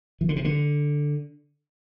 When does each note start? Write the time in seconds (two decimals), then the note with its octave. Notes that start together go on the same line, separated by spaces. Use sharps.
0.21 E3
0.29 D3
0.36 C3
0.45 D3